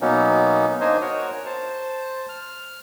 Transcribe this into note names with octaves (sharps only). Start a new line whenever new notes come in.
B2 F#3 A#3 B3 C#4 D#4
A#3 D4 D#4 C5 D#5 G#5
F#4 A#4 C#5
C5 A5
F6